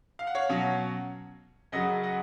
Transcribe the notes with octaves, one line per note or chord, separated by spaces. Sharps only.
F5
F#5
C#5 F5
B2 F#3 C#4
F#2 C#3 F#3 D#5 F#5
D#5 F#5